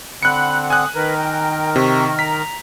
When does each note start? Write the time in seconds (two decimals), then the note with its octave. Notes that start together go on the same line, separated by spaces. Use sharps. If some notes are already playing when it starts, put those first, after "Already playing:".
0.23 D3 C4 F#5 B5 F#6 C#7
0.70 G#5 D#6 F#6
0.95 D#3 A#4 B4
1.18 G5
1.76 C3 C#6
2.19 A#5 B6